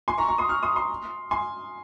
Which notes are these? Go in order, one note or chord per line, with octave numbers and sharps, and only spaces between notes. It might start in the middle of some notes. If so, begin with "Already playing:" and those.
G#5 C6
A#5 C#6
A#5 C#6
C6 D#6
C#6 F6
C6 D#6
C6 D#6
G#5 C6